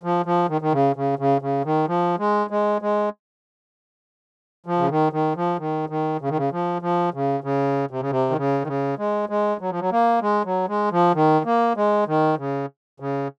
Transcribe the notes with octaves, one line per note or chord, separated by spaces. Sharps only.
F3
F3
D#3
D#3
C#3
C#3
C#3
C#3
D#3
F3
G#3
G#3
G#3
F3
C#3
D#3
D#3
F3
D#3
D#3
C#3
D#3
C#3
F3
F3
C#3
C#3
C3
C#3
C3
D#3
C#3
D#3
C#3
G#3
G#3
F#3
F3
F#3
A#3
G#3
F#3
G#3
F3
D#3
A#3
G#3
D#3
C#3
C#3